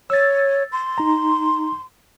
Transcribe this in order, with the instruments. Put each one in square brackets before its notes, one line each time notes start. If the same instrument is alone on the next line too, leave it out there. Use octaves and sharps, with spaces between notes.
[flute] C#5 [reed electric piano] E6 A6
[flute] C6
[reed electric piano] D#4 A#5